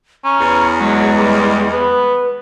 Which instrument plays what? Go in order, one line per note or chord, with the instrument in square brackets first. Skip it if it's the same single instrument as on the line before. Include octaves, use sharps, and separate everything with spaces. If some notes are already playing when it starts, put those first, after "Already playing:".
[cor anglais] C#4 [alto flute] A#5
[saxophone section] E2
[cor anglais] F#3 [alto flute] G#3
[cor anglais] G3
[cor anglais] B3 [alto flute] B4